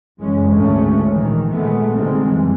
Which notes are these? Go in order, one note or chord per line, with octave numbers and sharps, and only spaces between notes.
F#1 F#2 E3 G#3 C#4
G#1 D2 G#2 G#3 A3 C#4
A#1 D#3 E3
A#2 G#3 A3 B3
D3 D#3 G3 G#3 C4
F2 E3